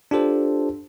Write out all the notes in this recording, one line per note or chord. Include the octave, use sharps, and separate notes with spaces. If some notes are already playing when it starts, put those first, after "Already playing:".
D4 F4 G4 A4 C5